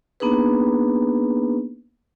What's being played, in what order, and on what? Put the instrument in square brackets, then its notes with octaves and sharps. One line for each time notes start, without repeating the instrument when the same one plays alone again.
[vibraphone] A#3 B3 D4 D#4 G#4 B4